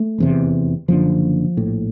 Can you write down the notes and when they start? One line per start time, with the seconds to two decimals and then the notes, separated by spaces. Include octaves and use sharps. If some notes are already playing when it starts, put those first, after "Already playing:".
Already playing: A3
0.18 F1 E2 C3
0.88 F#1 F#2 D3 F3
1.57 A#1 A2